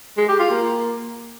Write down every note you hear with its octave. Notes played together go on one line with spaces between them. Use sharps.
G#3
G4
F4
A#3